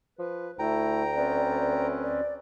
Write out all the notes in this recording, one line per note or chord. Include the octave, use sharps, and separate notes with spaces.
F3 B4
D2 A3 E4 G5 A#5
C4 C#4 B4 D5
D5